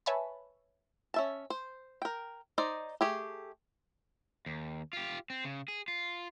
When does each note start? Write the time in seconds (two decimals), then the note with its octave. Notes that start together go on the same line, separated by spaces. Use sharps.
0.06 B4 C#5 E5 G#5 A5 B5
1.14 C#4 E5 A5
1.50 C5
2.02 A#4 G5
2.58 D#4 C5 D5 D#5
3.01 A3 G4 G#4
4.46 D#2
4.93 F4 G4
5.30 C4
5.45 C#3
5.68 G#4
5.88 F4